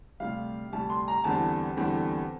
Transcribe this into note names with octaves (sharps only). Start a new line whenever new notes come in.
D2 C3 G3 F5
D2 C3 G3 A5
C6
A#5
E2 D3 G3 C4 A5
E2 D3 G3 C4